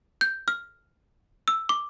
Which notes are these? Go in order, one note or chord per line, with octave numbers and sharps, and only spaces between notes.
G6
F6
E6
D6